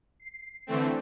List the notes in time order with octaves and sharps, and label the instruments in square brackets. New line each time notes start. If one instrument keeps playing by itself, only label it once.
[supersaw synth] C7
D3 E3 A3 C4